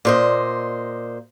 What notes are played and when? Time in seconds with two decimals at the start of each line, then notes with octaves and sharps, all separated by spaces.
0.05 A#2 C5 D#5